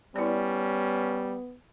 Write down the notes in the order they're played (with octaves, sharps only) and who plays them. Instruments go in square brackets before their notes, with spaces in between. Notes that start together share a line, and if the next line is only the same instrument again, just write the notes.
[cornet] G3 [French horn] B3 [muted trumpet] C#4 [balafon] E4 D5